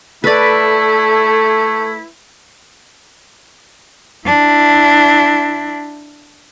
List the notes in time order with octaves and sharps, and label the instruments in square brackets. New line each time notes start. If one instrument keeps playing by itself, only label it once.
[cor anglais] A3 [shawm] E4 [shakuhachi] A4 [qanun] B4 D5
[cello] D4 E4